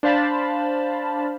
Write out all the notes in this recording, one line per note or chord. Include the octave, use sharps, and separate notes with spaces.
D4 C5 F5 A5 B5